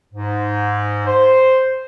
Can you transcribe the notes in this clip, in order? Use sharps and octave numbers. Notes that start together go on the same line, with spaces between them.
G#2
C5